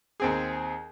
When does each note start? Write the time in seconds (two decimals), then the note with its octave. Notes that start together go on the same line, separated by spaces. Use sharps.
0.20 D#2 C4 G#4